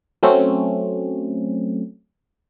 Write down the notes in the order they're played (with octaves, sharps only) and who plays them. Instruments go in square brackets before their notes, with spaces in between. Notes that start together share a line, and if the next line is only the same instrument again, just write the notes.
[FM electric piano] F#3 A3 C4 C#4